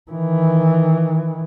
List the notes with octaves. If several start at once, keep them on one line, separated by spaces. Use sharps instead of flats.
D#3 E3